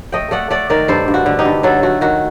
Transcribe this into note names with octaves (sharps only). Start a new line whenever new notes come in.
A3 D#5 G5
A3 D5 F#5
A3 D5 F#5
D#3 A#4 D5
G2 A4 C5
G2
F#4
D3
D#4 G4
G2
F#3 F#4 A4
A3 F#4
D#3 F#4